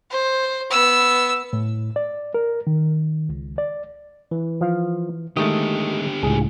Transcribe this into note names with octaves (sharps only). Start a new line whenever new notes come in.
C5
B3 E6
A2
D5
A#4
D#3
C#2
D5
E3
F3 F5
D3 D#3 G#3 A3 G4 D#6
C#2 A2 G#4